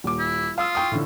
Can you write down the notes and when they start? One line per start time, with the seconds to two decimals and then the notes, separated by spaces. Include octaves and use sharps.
0.04 D#1 D6
0.19 E4
0.58 F4 F5 D#6 E6
0.75 G5 C#6 D#6
0.92 A2 D3